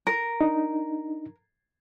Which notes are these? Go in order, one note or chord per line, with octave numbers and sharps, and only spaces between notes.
A#4
D4 D#4